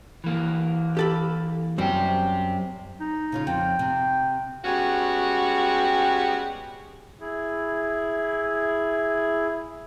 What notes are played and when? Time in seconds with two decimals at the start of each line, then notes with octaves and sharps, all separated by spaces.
0.24 E3 A#3
0.97 G4 A4 B5
1.78 F#2 G3 C4 G4
3.00 D#4
3.32 C#3 C#4 F4
3.47 F2 G5
3.79 C3
4.65 G3 G#3 B3 C#4 F#4 G4
7.20 E4 G#4